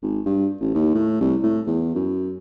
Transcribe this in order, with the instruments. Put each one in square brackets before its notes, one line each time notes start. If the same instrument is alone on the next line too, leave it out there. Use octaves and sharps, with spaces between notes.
[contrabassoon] G#1
G2
A1
D#2
A2
C2
A2
E2
F#2